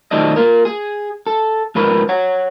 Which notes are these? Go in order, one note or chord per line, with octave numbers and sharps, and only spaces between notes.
B1 D#3 F3 A3 D4 D#5
A#3 F4 A#4
G#4
A4
G#2 F3 A#4 B4
C#5 F#5